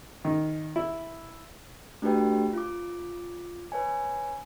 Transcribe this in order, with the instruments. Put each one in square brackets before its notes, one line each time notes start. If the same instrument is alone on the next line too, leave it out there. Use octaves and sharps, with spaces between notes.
[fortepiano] D#3
E4
[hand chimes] A3 D4 F#4 G4 B4 G5
F4 D6
B4 C#5 G#5